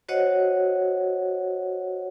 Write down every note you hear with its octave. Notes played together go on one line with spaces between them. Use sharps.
F#4 C5 C#5 D#5 F#5